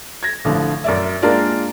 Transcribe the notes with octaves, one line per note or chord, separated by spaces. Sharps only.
G#6 A#6
A1 D3 F3
F#2 D5 E5
G#3 A#3 D4 F4 A#4 D5